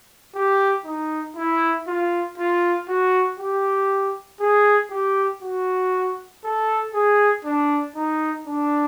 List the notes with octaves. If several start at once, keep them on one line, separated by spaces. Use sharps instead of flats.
G4
D#4
E4
F4
F4
F#4
G4
G#4
G4
F#4
A4
G#4
D4
D#4
D4